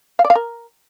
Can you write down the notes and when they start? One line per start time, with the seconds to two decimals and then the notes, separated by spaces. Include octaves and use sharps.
0.19 F5
0.25 D5
0.30 F5
0.35 A#4